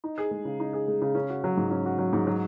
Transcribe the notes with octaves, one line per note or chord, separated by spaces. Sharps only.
D#4
G#4
G#3
C#3
D#4
G#4
G#3
C#3
C#4
F#4
F#3
G#2
C#4
F#4
F#3
G#2
F#3